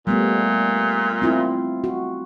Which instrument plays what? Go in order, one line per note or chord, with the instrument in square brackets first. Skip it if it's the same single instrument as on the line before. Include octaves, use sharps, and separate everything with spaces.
[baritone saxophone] A#2 [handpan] G3 A3 B3
[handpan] C4 E4 F4
F#4